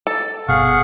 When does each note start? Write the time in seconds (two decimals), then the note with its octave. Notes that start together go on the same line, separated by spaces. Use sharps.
0.07 A4
0.48 G1 B2 G#4 F5 F#5 C#6